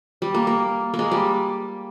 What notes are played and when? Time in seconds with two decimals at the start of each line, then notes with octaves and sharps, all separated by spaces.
0.22 G3
0.34 A#3
0.47 A#3
0.94 A#3
0.99 G#3
1.11 G3